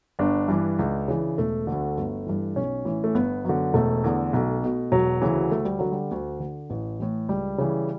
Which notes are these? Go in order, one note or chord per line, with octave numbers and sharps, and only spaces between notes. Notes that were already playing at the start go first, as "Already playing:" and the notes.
G1 D4
G2 E3
C#2
C#3 E3
E1 A3
D2 D3
G1
G2 E3
B1 C#4
A2 E3
A3
G1 B3
F#2 D3
E1 A3
E2 D3
B1
B2
E1 F#3
D2 C#3 E3
D2 A3
G3
D3 F#3
G3
D2
D3
A1
A2 E3
C#2 G3
C#3 E3